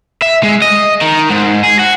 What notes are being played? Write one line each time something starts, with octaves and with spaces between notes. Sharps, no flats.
E5
G#3
D#5
D#3
G#2
G#4
F#4